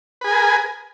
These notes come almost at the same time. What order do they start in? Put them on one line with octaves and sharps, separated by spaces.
B4 G#4 G#5 A#4